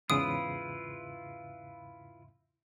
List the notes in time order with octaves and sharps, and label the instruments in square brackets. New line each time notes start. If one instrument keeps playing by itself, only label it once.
[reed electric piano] E2 G#2 C#3 [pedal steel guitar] E4 F4 B4 [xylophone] D#6